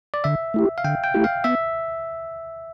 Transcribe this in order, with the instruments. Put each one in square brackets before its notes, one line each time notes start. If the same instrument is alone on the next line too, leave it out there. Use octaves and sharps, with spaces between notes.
[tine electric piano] D5
[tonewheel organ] D3 [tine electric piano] E5
[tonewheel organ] A3 E4 G4
[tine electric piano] F5
[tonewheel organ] D3 [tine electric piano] G5
[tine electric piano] G5
[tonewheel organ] A3 E4 G4
[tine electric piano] F5
[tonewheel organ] B3 [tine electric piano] E5